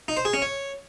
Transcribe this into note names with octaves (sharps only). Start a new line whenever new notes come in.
D#4
C5
G#4
C#4
C#5